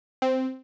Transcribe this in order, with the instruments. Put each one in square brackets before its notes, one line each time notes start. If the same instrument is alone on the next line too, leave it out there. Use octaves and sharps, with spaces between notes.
[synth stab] C4